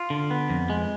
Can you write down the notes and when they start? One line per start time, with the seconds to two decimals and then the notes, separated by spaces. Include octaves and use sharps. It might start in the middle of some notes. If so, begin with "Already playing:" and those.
Already playing: F4
0.10 D3
0.31 B3
0.50 F2
0.70 G#3